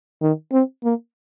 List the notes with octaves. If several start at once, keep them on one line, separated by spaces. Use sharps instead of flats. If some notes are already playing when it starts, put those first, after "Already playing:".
D#3
C4
A#3